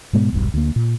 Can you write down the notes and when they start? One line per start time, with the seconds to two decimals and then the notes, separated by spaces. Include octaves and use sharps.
0.13 G#2 B2 G#3 B3
0.33 E1 B1 G2
0.54 D2 A#3
0.76 A#2